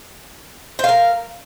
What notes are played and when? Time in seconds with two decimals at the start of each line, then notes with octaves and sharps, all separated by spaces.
0.79 C5
0.84 F5
0.89 A#4